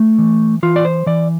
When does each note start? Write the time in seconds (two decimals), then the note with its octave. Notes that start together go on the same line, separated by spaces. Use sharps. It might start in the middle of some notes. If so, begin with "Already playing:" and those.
Already playing: A3
0.19 E3
0.63 E3 F4
0.76 D5
0.85 C5
1.06 E3 D5